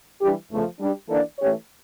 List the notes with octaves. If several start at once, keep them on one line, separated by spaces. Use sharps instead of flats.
E3 G3 D4 G4
E2 C#3 F3 A3
G3 D4 G4
E3 A#3 D4 A4 D5
E3 A3 C#4 G4 C#5